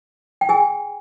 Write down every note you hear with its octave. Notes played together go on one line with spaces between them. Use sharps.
G5
G#4 G#5